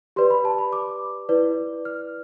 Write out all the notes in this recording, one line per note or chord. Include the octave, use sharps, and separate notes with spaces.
G4 B4 D5 C6
B5
A5
B5
D6
E4 B4 D5
F6